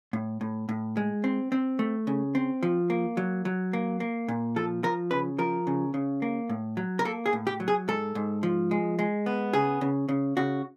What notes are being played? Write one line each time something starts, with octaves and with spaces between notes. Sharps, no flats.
A2
A2
A2
G#3
C4
C4
A3
C#3
C4
F3
A#3
F#3
F#3
A#3
A#3
A#2
F3 A4
F3 A#4
C#3 B4
F3 A#4
C#3
C#3
A#3
A2
F#3
A#4
A#3 A4
G#4
A2
G4
F#3
G#4
G#2 A4
G#2
F3
G#3
G#3
B3
C#3 G#4
C#3
C#3
C#3 F#4